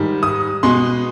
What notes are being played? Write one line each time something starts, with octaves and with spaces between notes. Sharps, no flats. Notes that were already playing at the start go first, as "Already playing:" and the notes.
Already playing: G#2 D#3 G3
D#6
B2 G#3 B3 C6